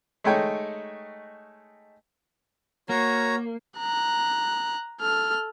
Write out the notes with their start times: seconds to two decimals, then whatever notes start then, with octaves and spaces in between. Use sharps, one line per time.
0.24 G#3 A3 D#4 C#5 G5
2.89 A#3 F#4 C#5 A#5
3.79 A#5 F#6
5.01 A4 F6